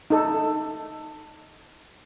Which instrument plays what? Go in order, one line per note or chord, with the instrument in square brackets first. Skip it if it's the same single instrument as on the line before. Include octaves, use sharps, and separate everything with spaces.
[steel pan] D#4 A4